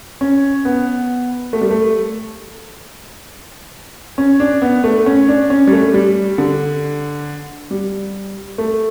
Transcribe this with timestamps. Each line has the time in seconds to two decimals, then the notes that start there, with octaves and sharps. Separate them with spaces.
0.21 C#4
0.65 B3
1.53 A3
1.61 G3
1.71 A3
4.18 C#4
4.40 D4
4.62 B3
4.84 A3
5.06 C#4
5.28 D4
5.50 C#4
5.67 G3
5.72 A3
5.94 G3
6.38 D3
7.71 G3
8.58 A3